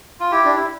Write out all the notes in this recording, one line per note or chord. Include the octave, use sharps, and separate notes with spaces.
F4
E4 G4
D4
E4